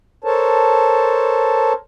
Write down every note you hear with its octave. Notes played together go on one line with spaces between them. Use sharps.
A4 A#4 C5 C#5 A5